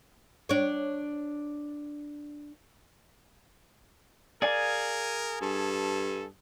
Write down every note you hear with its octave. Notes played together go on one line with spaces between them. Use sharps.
D4 C#5
G#4 A#4 D5 F5 G#5
G2 A4